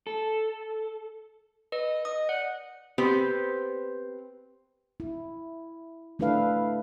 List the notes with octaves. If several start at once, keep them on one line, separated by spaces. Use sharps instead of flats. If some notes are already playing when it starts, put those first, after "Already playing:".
A4
B4 D#5
D#5 D#6
D5 F#5
B3 C4 G4 B4 C5
E4
A3 D4 E4 A4 B4 F5